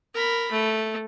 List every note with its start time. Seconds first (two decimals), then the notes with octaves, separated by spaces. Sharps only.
0.14 A#4 B5
0.51 A3